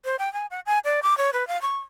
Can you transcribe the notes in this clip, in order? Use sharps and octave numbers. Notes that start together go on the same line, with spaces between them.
C5
G5
G#5
F#5
G#5
D5
D6
C#5
B4
F5
C#6